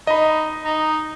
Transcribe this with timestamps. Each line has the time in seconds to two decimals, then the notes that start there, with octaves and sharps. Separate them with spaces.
0.07 D#4 D#5 B5
0.65 D#4